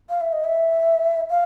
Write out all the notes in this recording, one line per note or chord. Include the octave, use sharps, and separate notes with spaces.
F5
E5
D#5
E5
F5